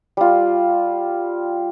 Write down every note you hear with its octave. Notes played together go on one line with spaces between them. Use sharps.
G3 F4